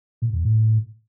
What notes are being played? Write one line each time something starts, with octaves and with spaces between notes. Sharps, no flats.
A#2
E2
A2